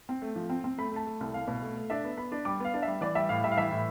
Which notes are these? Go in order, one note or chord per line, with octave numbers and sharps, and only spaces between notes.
C4
A3
F3
C4
C4
A3 B5
A3 A5
A3
C2
C2 F5
B2
A3
A3
D4 E5
B3
B3 B5
D4
G3 D6
B3 F5
D4
E5
G3
E3 D5
G3 E5
A2 F5
G3 E5
F5
E3 E5
A2